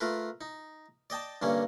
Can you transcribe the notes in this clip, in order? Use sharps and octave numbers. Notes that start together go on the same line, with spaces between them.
A3 F4 A#4 B4
D#4
D5 D#5 G5 A5
G2 D3 A#3 C#4